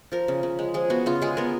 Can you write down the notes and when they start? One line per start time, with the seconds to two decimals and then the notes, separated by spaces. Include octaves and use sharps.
0.12 F3 A#4
0.28 C#3
0.43 C#3
0.59 G#3
0.74 F3 G#4
0.90 B3 F#4
1.06 C#3 F4
1.22 G#3 G#4
1.37 B3 A#4